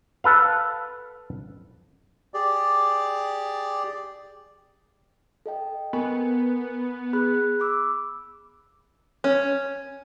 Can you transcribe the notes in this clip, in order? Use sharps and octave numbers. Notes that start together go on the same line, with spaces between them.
A4 B4 F5
G4 G#4 D5
A4 D#5 G5
B3 A#4 G#5 C#6
G#4 B5 F#6
B5 D6 E6
C#4